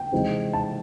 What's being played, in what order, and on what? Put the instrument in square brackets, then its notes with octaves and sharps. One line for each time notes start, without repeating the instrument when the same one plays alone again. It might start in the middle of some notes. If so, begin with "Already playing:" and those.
Already playing: [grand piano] G5
C3 E3 G#3 C4 D#4
A5